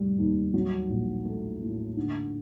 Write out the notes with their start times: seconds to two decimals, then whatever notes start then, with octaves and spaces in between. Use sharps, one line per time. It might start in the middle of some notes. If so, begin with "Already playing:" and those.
Already playing: F1 G3
0.18 D#2
0.54 F#3
0.89 A#1
1.25 A3
1.61 A2
1.97 D3